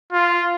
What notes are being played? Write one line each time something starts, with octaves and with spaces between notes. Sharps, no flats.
F4